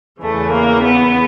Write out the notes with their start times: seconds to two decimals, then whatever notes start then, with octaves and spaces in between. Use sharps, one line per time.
0.22 E2 C#3 E3 A3
0.52 A#3
0.83 B3